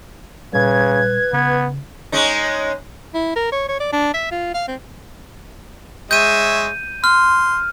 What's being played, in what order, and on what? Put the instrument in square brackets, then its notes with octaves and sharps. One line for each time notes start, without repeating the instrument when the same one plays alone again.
[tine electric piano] A#2 G3 [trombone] C#3 [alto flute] B4 [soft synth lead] G#6
[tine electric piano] C#3 [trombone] B3
[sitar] G#3 C#4 D#4
[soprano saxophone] E4
A#4
C#5
C#5
D5
D4
E5
F4
F5
C4
[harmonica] G#3 C#5 E5 [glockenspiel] G6 D#7
[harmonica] C6 [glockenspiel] F6